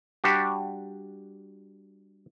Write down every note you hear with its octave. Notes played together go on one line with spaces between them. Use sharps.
G3 D4 F#4 G4